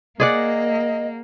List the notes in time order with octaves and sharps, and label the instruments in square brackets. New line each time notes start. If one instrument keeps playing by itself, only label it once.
[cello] A#3 [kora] G#4 D5 F#5 [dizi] D#5